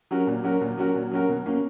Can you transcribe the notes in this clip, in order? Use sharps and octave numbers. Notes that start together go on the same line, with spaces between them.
F#3 C#4 F#4 A#4
A#2
F#3 C#4 F#4 A#4
A#2
F#3 C#4 F#4 A#4
A#2
F#3 C#4 F#4 A#4
B2
A#3 C#4